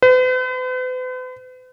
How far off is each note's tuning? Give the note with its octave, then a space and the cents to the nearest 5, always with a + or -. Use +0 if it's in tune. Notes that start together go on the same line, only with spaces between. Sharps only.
B4 +45